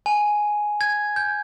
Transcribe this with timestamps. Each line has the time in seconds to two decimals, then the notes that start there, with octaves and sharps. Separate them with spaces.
0.06 G#5
0.81 G#6
1.16 G6